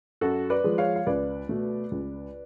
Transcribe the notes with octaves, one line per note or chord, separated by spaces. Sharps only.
F#2 F#4 A4
B4 D5
F3 G#3
C#5 F5
F5
C#2 B4 D5
B2 A3
C#2